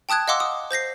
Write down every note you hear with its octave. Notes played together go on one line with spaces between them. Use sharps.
G5 A5 D#6 F#6 G#6
D#5 F5 F#5 C6 D6 E6
D#6
C5 G6 A#6 C7